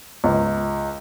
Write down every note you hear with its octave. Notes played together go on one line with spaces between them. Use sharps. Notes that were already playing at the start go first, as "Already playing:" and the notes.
C#2